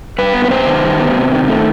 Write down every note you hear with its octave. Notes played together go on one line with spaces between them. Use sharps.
G3 B4
B3
B4
C3 C5
D#3
G3
B3
C3
D#3
A3